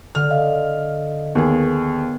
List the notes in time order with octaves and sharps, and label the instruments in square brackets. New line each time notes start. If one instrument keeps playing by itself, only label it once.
[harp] D3 [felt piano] F6
[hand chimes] D#5 F5
[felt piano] D#2 G#4 [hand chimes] B3